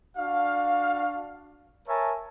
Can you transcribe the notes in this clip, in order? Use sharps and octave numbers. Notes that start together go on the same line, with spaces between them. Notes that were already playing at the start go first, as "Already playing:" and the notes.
D4 F#4 F5
A#4 C#5 E5 G#5 A5